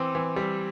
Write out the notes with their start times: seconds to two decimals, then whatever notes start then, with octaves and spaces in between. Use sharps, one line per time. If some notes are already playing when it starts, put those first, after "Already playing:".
Already playing: E3 C4 D6
0.15 E3
0.36 G3